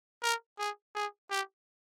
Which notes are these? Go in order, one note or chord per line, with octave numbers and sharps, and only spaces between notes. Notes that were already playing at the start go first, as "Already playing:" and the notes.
A#4
G#4
G#4
G4